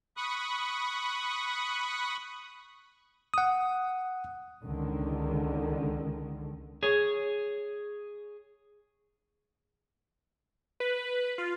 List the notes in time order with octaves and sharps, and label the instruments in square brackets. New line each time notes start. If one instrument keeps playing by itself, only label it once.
[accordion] B5 C#6 D#6 F#6
[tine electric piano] F#5 D#6
[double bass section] C#2 D3 D#3
[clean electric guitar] G#4 C#5
[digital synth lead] B4
F4